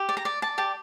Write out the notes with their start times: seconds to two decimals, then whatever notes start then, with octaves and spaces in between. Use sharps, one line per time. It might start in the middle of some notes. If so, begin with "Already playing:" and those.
Already playing: G4
0.09 D5
0.17 A#5
0.25 D5
0.42 D5 A5
0.58 G4 A5